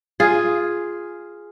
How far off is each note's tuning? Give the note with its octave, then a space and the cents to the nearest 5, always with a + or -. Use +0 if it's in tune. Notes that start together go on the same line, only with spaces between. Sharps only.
F4 +0 G#4 +0